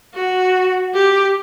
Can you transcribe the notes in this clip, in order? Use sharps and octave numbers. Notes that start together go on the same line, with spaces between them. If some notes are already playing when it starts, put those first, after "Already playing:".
F#4
G4